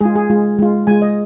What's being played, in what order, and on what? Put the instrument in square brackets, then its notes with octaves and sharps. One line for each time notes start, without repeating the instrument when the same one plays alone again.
[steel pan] G#3 F4 G#4
G#4
G#3 F4
G#3 F4
G#3 F4 G#5
D#5